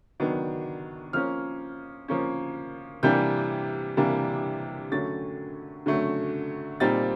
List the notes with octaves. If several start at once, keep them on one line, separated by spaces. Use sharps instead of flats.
D#3 F#3 B3 D4
F3 A#3 C#4 F6
F3 A#3 C#4
C3 E3 G3 A#3 D4 G6
C3 E3 G3 A#3 D4
D3 F#3 A3 C#4 A6
D3 F#3 A3 C#4
A#2 G3 C4 D#4 A6